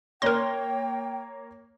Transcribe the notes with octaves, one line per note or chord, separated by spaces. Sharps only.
A#3 A#4 C#5 G5 C6 A#6